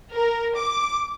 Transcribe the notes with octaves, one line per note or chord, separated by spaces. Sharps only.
A#4
D6